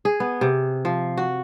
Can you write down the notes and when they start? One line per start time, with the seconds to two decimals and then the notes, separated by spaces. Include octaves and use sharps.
0.05 G#4
0.20 B3
0.41 C3
0.85 F3
1.18 F#4